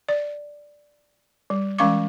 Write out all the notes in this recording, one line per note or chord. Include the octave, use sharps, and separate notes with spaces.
D5
G3
E3 G#3 C#4 F5 C#6 D6